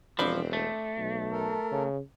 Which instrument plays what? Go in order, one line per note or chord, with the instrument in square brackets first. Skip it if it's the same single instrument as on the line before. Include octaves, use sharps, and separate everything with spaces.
[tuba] E1 [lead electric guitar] F3 [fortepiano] C4 D4 B5
[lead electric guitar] A3
[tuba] B1
[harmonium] A4 A#4
[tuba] C#3